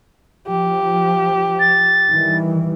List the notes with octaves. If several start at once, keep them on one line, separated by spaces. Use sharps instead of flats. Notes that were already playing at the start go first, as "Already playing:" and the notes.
F3 G4
A6
D#3 E3 G3